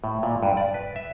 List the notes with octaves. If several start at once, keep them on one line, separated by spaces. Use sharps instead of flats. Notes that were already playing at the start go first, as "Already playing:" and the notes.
A2
A#2
G2
D5
B4
E5